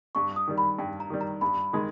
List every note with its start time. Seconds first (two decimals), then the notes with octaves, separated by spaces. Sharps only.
0.15 G2 C#6
0.36 D#6
0.47 D#3 G3
0.58 B5
0.78 G2 G5
1.00 A#5
1.10 D#3 G3
1.21 A#5
1.41 G2 B5
1.73 D#3 G#3